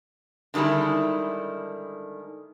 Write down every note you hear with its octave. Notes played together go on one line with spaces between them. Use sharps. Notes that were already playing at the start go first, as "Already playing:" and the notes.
D3 D#3 G3 G#3 E4